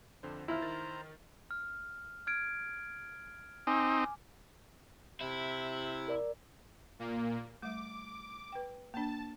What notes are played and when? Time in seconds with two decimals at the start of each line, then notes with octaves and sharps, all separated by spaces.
0.23 F2 D3 C5
0.48 D#2 E4 F4 C5 A#5 F6
0.62 D#3 A6
1.51 F6
2.27 F6 G#6 D7
3.67 C4 D#4 G#5 D6
5.21 C3 E4
6.08 A#4 D5
6.99 A#2 A#3
7.62 G3 A3 D6
8.52 B4 G5
8.94 A#3 D4 A5